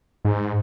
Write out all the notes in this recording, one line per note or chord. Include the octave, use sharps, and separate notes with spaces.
G#2